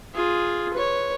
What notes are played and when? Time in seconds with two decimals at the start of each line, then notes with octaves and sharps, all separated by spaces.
0.15 F4 G#4
0.74 B4 C#5